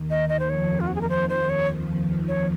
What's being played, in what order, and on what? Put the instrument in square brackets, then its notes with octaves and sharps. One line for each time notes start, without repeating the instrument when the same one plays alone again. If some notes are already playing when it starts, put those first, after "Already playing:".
Already playing: [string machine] D#2 D#3
[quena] D#5
D#5
C5
[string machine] F2 F3 [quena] C#5
[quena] F4
F#4
G#4
A#4
C5
C5
C#5
C#5